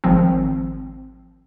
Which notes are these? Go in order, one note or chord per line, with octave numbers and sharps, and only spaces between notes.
G#1 F3 C4